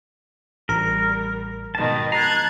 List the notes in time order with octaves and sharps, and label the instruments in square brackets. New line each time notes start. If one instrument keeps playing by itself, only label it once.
[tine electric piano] A1 A#5 [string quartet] G3 [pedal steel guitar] A#4
[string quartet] G#2 B2 D#3 [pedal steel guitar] A5
[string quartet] A5 F#6 G#6 [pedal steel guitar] A#5 [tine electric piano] C7